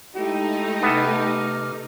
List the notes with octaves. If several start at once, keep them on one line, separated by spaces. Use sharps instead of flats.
G#3 A3 D#4 E4 G4
C3 B3 A4 D6 F6